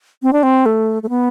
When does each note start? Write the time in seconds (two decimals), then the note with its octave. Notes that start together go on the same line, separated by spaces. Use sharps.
0.22 C4
0.33 D4
0.43 C4
0.66 A3
1.03 A3
1.09 B3